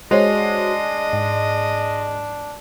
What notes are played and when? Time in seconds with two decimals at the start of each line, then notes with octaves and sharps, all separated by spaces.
0.11 G#3 D4 F#4 C5 C#5 D#5
1.13 G#2